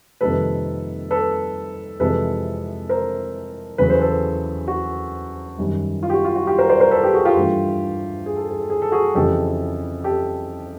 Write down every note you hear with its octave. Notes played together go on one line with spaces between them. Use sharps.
F2 C3 D#3 G3 A#3 A4 B4
A4 B4
F2 C3 E3 G#3 A4 B4
A#4 C5
E2 C#3 F#3 A3 B4
C5
A4 B4
F#4
F#2 D#3 G3
F4
G4
F#4
F4
F#4
F4 G4
A#4 C5
C5 D5
A#4 C5
A4 B4
G4 A4
F#4 G#4
F4 G4
G2 E3 A3
G#4
A4
G#4
A4
G#4
A4
F#4 G#4
F2 C#3 E3 A3 G4 A4
G4 A4